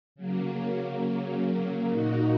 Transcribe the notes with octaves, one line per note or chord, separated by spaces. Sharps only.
C#3 F#3 A#3
A#2 A#3 D#4 F#4